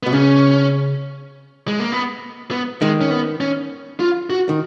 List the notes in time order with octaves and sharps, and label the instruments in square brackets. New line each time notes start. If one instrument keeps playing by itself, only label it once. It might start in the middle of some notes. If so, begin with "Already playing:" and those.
[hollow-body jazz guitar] B2 [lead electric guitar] B3
[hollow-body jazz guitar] C#3 [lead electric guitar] C#4
[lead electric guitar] G#3
A#3
B3
B3
[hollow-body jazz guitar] D#3 [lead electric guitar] G#3
[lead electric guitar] C#4
B3
C#4
F4
F#4
[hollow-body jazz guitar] D#3